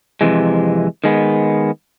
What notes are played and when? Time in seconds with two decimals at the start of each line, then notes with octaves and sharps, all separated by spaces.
0.21 F2 C3 E3 G#3
1.04 D#3 G#3 B3